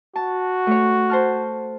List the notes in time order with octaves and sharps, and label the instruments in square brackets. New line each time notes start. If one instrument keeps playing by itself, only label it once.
[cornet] F#4 [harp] A5
[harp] A3 C#5
C5 A5 F6